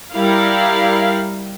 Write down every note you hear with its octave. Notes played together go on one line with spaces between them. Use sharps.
G3 E4 A#4 F5